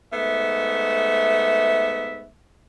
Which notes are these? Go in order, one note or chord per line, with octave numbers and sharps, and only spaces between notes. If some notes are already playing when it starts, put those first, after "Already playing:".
G#2 A3 B3 E5